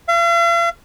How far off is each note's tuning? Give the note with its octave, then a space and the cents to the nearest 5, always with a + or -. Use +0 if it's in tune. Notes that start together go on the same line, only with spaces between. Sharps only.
F5 -45